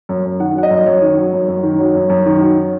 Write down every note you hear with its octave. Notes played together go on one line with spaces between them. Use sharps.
F#2
F#2
D#3 F#5
F#3 F#5
D#5
F#2
F#2 C#5
D#3
F#3
F#2
F#2
D#3
F#3
F#2
F#2
D#3
F#3